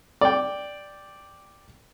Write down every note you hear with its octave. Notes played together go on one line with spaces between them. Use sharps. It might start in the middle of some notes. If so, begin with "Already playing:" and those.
D5 G5